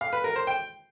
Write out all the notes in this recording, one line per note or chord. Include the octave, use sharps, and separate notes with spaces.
F5
B4
A#4
C5
G5